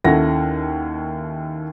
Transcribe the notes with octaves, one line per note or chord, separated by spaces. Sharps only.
D#2 C#4 E4 A4 F#5 A#6